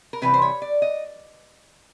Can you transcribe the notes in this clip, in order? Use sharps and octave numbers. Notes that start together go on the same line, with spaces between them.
A#4
C3 E3 G3 B4
C5
C#5
D5
D#5